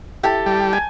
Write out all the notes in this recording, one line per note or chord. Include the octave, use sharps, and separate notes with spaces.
E4 G4 A4 G5 A5
G3
G#5